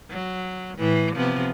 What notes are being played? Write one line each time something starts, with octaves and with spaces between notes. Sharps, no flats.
F#3
A2 E3
C3 F3 B3